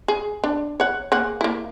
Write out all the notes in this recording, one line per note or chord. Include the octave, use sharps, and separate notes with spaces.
G#4
D4
C#5 F#5
A#3 G#4 F#5
A#3 E4